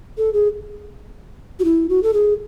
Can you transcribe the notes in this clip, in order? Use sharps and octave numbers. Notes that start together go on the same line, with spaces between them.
A4
G#4
F#4
E4
F#4
A4
G#4